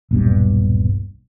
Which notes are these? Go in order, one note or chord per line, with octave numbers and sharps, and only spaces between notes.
D#1 B1 G2